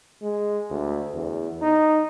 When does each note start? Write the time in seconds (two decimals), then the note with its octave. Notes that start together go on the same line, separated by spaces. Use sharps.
0.22 G#3
0.70 D2
1.14 E2
1.62 D#4